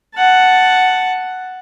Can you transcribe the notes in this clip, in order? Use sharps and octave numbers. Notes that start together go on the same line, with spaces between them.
F#5 A5